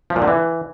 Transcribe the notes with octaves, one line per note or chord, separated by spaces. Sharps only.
F3
A#2
D3
E3